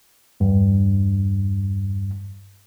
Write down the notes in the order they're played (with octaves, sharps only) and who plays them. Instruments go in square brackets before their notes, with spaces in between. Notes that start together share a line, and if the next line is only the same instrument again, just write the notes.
[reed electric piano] E2 G2